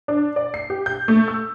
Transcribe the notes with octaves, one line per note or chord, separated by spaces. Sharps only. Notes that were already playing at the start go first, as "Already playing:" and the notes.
D4
D5
C7
G4
G6
A3
E6